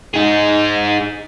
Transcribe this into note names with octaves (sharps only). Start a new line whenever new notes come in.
D#4 G#4